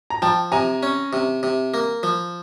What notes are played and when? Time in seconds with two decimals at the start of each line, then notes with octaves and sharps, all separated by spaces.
0.10 A#5
0.22 F3 G5 A5
0.52 C3 G#5 A#5
0.83 C#4
1.13 C3
1.43 C3
1.74 A#3
2.03 F3